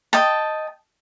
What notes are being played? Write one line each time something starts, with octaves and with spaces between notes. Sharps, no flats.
D#5 G5 A5